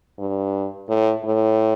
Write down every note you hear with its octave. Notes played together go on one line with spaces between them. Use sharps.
G2
A2
A2